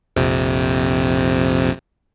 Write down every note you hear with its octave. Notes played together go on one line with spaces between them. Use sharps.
A#1 F2 C3